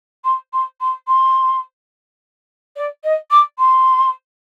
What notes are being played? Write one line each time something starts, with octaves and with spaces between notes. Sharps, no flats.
C6
C6
C6
C6
D5
D#5
D6
C6